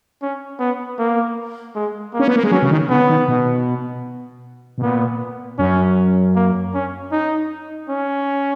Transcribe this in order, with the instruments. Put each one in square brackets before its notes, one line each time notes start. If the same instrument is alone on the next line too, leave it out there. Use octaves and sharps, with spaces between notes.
[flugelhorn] C#4
B3
A#3
G#3
A#3
[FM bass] C#4
B3
A#3
G#3
[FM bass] F#3 [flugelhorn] C#4
[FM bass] C#3
D#3
[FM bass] C#3 [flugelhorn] B3
[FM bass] D#3
B2
B2
[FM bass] A#2 [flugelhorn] B3
[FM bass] F#2 [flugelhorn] C#4
[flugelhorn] A#3
C#4
D#4
C#4